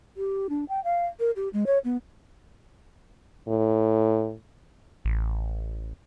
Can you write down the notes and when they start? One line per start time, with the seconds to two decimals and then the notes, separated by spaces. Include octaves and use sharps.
0.17 G4
0.50 D4
0.69 G5
0.84 F5
1.20 A#4
1.36 G4
1.53 G#3
1.66 C#5
1.85 B3
3.48 A2
5.05 A1